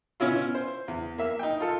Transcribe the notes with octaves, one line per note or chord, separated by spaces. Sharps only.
B2 C#4 E4 F4
C5
E2
A#3 E5
D#4 G5
F4 A4